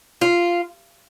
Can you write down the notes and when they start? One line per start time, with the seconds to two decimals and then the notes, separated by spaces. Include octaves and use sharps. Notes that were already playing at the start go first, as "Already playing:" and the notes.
0.21 F4